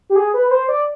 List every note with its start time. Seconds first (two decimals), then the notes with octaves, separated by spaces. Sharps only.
0.10 G4
0.16 G#4
0.34 B4
0.47 B4
0.51 C5
0.68 D5